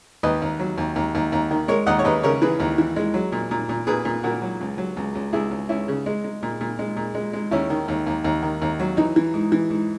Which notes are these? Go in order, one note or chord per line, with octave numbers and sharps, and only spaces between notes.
D#2 B4 D#5
D#2
F#3
D#2
D#2
D#2
D#2
D#3
G#3 A#4 C#5
D#2 D#5 F#5
C#5
D#2 B4 D#5
C#3 A#4 C#5
E3 G#4 B4
D#2
E3
G#3
F#3
A#2
A#2
A#2
A#2 G#4 B4
A#2
A#2 F#4 A#4
F#3
C#2
F#3
C#2
C#2
C#2 E4 G#4
C#2
C#2 C#4 E4
C#3
G#3
G#3
A#2
A#2
G#3
A#2
G#3
G#3
D#2 C#4 E4
D#3
D#2
D#2
D#2
D#3
D#2
F#3
E3 D#4
E3
G#2
E3
G#2